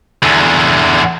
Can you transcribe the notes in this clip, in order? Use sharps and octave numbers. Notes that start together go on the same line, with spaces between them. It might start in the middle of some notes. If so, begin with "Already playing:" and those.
E2 D3